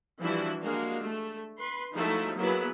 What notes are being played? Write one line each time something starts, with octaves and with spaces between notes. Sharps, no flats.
E3 F3 G3 D4 E4 F#4
G#3 A#3 D4 F#4 F5
A3
B4 C6
F3 F#3 G#3 A3 D#4 E4
F#3 A#3 B3 E4 G#4 B4